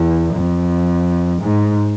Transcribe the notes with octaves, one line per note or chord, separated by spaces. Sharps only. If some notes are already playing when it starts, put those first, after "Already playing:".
Already playing: E2
F2
G#2